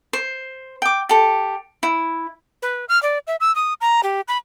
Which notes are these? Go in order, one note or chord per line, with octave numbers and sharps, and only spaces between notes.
C5
G5 D6
G4 A4
E4
B4
F6
D5
E5
E6
D#6
A#5
G4
B5